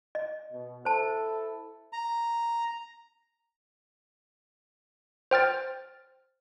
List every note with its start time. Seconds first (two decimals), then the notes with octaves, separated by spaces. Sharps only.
0.15 D#5
0.52 B2
0.85 E4 A4 C5 A5
1.93 A#5
5.31 C5 G5 F6 A6